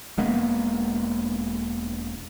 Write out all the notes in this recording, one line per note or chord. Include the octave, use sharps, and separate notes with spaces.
E1 G#3 A#3 B3